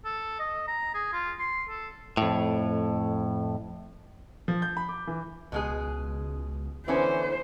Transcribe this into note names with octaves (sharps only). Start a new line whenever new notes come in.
A4
D#5
A#5
G#4
F4
C6
A4
F2 A2
F3
G6
B5
D6
E3
C#2 B2 G#3 G#4
D3 E3 B3 C#4 C5